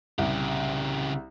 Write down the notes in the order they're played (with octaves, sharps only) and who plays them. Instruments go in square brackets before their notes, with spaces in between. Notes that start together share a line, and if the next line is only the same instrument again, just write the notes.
[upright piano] C2 [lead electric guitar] C#3 G4